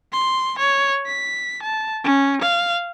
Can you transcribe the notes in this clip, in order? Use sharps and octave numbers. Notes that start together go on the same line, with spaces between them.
C6
C#5
B6
A5
C#4
F5